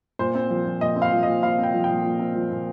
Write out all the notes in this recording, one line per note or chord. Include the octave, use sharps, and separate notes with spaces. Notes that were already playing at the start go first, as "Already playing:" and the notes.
A#2 C5
C4
F3
A#2
A#2 D#5
C4
F5
F3
D#5
A#2
A#2 F5
C4
G5
F3
G5
A#2
A#2
C4
F3
A#2